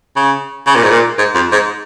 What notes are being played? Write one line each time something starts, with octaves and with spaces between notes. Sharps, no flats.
C#3
C#3
A#2
G#2
A#2
G#2
F2
G#2